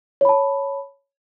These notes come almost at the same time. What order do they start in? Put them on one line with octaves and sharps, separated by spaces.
C#5 B5 A5